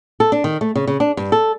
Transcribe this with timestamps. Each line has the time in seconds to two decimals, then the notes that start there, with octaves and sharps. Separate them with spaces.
0.20 A4
0.32 D4
0.44 D#3
0.61 A3
0.75 C#3
0.87 C#3
1.00 D4
1.17 G2
1.32 A4